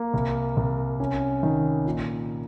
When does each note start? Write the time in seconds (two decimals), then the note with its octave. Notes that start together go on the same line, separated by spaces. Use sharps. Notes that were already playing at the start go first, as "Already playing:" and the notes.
Already playing: A#3
0.14 C2
0.57 C2
1.00 C#4
1.43 D#3
1.86 A#2